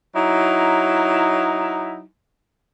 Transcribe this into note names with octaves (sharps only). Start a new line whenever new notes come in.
F#3 D#4 E4